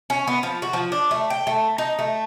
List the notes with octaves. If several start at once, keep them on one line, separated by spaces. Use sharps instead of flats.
C#4
B3
F3
F#4
F3
D4
A3
G5
A3
D#4
A3